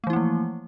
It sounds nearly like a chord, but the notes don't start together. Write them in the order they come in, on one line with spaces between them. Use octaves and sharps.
A3 E3 E4 A#3 F3